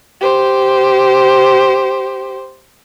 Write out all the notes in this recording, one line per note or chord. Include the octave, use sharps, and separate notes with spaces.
G4 C5